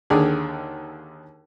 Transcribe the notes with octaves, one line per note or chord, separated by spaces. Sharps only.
D#2 D3 D#3 G#4